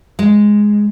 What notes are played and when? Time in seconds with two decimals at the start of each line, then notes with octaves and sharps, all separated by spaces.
0.19 G#3